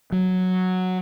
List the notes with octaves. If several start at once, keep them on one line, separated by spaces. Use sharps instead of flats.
F#3